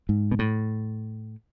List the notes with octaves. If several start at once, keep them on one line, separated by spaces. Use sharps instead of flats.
G#2
B2
A2